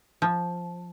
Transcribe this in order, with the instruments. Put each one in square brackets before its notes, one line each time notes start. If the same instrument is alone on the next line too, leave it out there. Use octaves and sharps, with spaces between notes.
[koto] F3